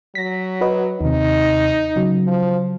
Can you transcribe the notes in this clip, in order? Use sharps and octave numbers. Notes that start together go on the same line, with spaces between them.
F#3 A#6 B6
F#4 B4 D#5
D#2 C3 D#4
C#3 F#3
F3